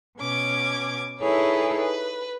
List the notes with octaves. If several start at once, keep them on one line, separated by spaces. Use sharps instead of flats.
B2 C#4 D6 G#6
D#4 E4 G#4 A4 B4 C#5
B4